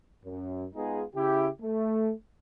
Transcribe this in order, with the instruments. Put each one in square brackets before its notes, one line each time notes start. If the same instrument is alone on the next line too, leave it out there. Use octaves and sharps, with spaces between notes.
[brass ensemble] F#2
G#3 B3 D#4 F4 G#4
C#3 E4 G4
A3